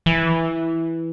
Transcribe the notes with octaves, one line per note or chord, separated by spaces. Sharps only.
E3